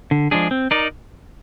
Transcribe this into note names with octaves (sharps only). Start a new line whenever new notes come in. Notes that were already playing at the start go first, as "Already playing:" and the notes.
D3
F3 G#3 D4 G#4
C4
D#4 A#4 D5